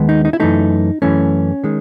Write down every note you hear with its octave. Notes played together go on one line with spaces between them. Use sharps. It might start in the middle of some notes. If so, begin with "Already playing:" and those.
Already playing: D#2 D#3 G#3 B3
D#4
D#4
E4
F#2 E3 A3 D#4
F#2 E3 A3 C#4
D#3 G#3